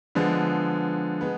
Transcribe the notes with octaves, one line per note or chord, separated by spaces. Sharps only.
D3 F3 G#3 B3
G#3 B3